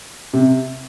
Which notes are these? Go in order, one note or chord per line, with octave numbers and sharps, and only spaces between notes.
C3